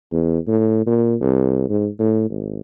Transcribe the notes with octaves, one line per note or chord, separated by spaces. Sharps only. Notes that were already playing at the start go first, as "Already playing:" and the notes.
E2
A2
A#2
C2
G#2
A2
G#1